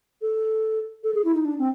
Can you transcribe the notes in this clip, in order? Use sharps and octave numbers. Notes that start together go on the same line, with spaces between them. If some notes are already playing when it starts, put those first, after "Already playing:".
A4
A4
G#4
E4
D#4
D4
C4